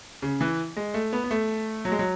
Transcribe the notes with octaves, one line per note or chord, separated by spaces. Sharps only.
C#3
E3
G#3
A3
B3
B3
A3
F#3
G#3
F#3